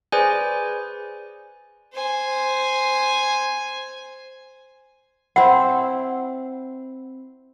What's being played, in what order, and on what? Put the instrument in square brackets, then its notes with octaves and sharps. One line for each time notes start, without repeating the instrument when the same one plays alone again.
[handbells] G#4 B4 C5 D5 G#5
[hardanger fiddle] C5 G#5
[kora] C4 E4 [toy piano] F#5